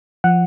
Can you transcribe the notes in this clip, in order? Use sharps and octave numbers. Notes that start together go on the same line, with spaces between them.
F3 F#5